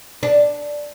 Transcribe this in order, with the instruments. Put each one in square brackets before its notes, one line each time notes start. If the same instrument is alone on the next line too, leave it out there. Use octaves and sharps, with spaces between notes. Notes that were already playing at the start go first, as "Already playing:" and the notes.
[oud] D4